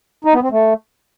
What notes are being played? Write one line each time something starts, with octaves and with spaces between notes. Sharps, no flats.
D#4
B3
C4
A3